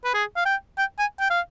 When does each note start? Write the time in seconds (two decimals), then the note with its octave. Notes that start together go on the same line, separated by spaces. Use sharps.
0.05 B4
0.14 G#4
0.36 F5
0.46 G5
0.78 G5
0.99 G#5
1.20 G5
1.30 F5